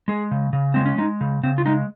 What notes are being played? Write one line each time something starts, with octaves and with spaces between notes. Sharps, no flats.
G#3 G#4
C#3
C#3
G#3 C4
C#4
G#3 D#4
C#3
C#3 C4
F4
G#3 D#4